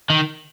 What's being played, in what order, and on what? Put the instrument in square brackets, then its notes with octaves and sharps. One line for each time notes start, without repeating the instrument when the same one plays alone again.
[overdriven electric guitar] D#3